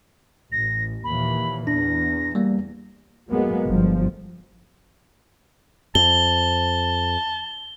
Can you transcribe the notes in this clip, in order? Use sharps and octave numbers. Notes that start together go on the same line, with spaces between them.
A1 A#6
D#2 A#2 E3 B5
E2 D4 A#6
G3 A#3
F#3 G#3 A#3 B3
G1 F3
F2 A5 G7